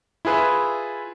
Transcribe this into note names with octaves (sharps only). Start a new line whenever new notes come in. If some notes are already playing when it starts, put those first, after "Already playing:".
E4 F4 G#4 B4 E5